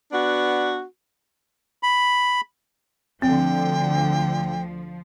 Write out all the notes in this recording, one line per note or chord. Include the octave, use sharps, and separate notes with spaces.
B3 D4 F#4
B5
D2 D3 F3 C4 G5